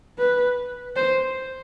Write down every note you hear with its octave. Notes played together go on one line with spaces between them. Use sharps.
B4
C5